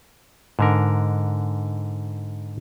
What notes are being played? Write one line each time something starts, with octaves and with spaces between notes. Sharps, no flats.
G#2 D3 A#4